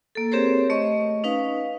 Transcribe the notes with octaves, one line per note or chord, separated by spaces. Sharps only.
A#3 A4
C4 G4 G#4 A#4 C5 C#5
A3 D#5 C#6
C#4 D#4 B4 F5